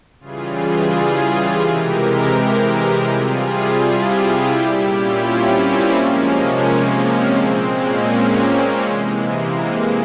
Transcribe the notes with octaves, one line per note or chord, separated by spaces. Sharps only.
C#3 E3 G3 F4 G#4
F4 G#4
F4 G#4
C3 E3 G#3 G4 A#4
C3 G3 F4 G#4
E4 G4
E4 G4
A#2 G3
C#4 F4
C4 E4
A#3 C#4
C3 F3 G#3 A#3 C#4
G#3 C4
A#2 G#3
A#3 C#4
G#3
G#3
C3 E3 G#3
A#3